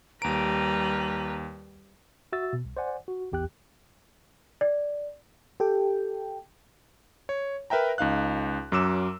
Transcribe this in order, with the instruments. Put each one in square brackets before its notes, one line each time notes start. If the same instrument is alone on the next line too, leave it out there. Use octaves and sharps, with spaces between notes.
[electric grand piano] D#2 D7 [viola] G3 B4 [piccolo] A#5
[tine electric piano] F#4 E5 E6 A6
B2
C2
C5 D5 F#5 G#5
F#4
A1 E2 G4 G5 F#6
[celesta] D5
[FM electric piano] G4 A4 G5
[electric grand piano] C#5
A#4 B4 E5 G5 A#5
C#2 D#4 F5 F#6
F#2 F#3 D6 E6 E7